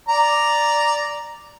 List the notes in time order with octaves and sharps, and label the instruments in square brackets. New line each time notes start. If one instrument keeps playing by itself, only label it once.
[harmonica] D5 A#5